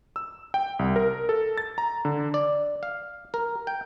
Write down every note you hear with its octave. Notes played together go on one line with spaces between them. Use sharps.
E6
G5
C2
A#4
A4
A6
A#5
D3
D5
F5
A#4
G5